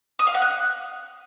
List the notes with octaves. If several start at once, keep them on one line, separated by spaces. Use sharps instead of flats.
D#6
F5
F#5
F#6